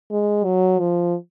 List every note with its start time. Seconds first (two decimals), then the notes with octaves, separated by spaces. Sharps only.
0.12 G#3
0.45 F#3
0.80 F3